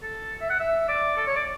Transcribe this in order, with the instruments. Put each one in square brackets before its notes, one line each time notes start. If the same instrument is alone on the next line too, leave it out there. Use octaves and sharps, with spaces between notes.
[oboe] A4
E5
F#5
E5
D5
A4
C#5
D5